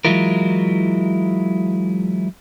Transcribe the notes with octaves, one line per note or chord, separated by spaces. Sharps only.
E3 F#3 G#3 E4 F4 A#4